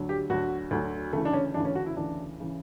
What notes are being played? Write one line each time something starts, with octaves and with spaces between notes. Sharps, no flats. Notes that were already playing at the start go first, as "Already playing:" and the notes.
Already playing: D2 D3 F#3
G4
D2 D3 F#3 F#4
D2 D3 F#3
D2 C#3 E3 A3
D4
C#4
D2 C#3 E3 D4
C#4
F#4
E4
D2 C#3 E3 D4
C#3 E3